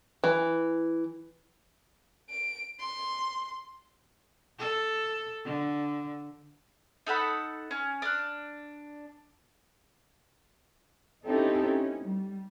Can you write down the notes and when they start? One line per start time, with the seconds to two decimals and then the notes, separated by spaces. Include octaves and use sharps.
0.24 E3
2.30 D7
2.80 C6
4.59 A4
5.45 D3
7.07 D#4 A4 F#5 B5
7.71 C#4
8.02 D4 F6 F#6
11.24 C4 C#4 D#4 E4 G4 A4
11.62 C#4
12.04 G3